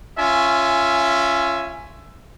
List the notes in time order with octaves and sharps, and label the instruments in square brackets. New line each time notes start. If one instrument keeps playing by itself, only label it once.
[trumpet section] C#4 F4 E5 G#5